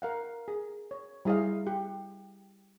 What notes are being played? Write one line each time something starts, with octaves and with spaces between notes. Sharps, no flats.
A#4 F5 F#5
G#4
C#5
G3 E4 G#4 D#5 F5
G4